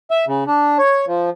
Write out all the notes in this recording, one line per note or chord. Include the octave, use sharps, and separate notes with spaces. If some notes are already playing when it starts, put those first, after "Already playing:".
E5
C#3
D4
C#5
F3